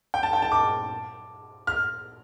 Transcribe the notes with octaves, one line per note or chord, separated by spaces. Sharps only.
G5
A5
G5
A5
D6
F6